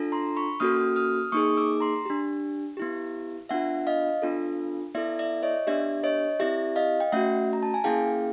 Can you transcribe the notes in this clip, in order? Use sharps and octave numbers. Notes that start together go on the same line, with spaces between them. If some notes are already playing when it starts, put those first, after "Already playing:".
Already playing: D4 F4 A4
A#5 C6
B5 C#6
A#3 C#4 F#4 A4 D#6 F6
D#6 F6
A#3 D#4 G#4 C#6 D#6
D6 E6
A#5 C6
D4 G4
B3 E4 G4
B3 D4 F4 E5 F#5
D#5 F5
B3 D4 F4 A4
B3 E4 A4 D5 E5
D5 E5
C#5 D#5
B3 D4 G4 D5 E5
C#5 D#5
C4 E4 G4 D5 E5
D#5 F5
G5
A3 C#4 F#4 E5 F#5
A#5
A5
G#5
A#3 C#4 E4 G#4 F5 G5